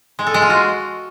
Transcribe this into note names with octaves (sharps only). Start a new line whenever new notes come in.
G#3
A4
G#3
F4
F#4